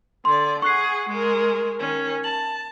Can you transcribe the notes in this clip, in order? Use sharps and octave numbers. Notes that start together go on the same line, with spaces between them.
D3 D5 C6
G#4 F#5 C#6 F#6 C7
G#3 A#4
D#3 C#4
A5 F#7